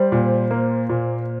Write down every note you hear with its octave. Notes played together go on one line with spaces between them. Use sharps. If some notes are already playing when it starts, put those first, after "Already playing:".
Already playing: G3 C5
A#2
A#3
A#2